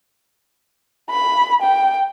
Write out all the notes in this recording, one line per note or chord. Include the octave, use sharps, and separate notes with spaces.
B5
G5